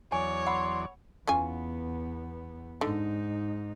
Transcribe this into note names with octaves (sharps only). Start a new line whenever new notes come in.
E2 F#3 C#5 D5 G#5
F#5 B5 C6 E6
E2 B3 C#4 F4 G#5
G#2 D3 D#4